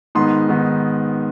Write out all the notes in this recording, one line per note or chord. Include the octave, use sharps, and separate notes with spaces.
G#2 D#3 B3 D#4 C6
G#2 D#3 B3 D#4